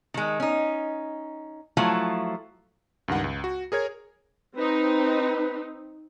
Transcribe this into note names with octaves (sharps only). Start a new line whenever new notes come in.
D#3 G#3
C#4 D#4
F3 F#3 A3 E4 F4
C#2 G2 D#3 F#5
C#2
F#4
G#4 A#4 C#5 G#6
C4 D#4 B4